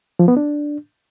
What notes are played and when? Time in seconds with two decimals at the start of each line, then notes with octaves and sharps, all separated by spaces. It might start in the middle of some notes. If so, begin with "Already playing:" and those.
0.19 F3
0.28 B3
0.37 D4